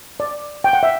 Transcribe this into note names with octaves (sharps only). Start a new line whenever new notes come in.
D5
G5
F#5
E5